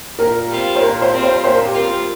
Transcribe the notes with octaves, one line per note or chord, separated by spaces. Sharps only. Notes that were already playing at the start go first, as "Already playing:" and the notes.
A#2 A#4
G3 C4 F4
C5
A#2 A#4
C5
G3 C4 F4
C5
A#2 C5
A#4
G4
G3 C4 F4 A#4